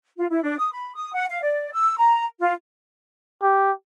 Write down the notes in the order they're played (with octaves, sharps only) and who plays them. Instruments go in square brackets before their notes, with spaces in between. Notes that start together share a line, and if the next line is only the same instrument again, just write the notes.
[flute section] F4
E4
D4
D#6
B5
D#6
F#5
F5
D5
E6
A#5
F4
[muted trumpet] G4